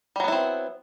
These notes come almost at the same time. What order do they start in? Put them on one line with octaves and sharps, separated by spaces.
G3 F#3 B3 E4 C4